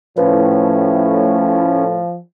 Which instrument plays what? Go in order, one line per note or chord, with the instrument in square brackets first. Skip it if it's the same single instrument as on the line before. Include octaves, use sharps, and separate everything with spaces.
[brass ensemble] A2 [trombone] F3 [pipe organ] C#4 [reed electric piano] B4